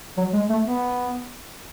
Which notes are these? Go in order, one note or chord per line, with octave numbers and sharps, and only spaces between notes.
F#3
G#3
A3
B3